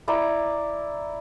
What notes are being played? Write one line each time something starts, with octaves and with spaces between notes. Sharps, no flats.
E4 D5 A#5